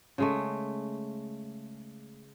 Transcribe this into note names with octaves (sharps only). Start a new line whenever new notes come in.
C#3 G#3 A3